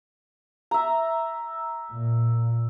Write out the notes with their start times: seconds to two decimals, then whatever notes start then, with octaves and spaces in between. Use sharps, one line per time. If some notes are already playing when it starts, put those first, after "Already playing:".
0.71 E5 A#5
1.90 A#2